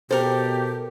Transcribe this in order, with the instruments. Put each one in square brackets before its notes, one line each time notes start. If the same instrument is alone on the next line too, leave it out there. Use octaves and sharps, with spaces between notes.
[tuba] B2 [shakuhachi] G4 [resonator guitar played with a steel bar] A4 A#4 [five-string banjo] C5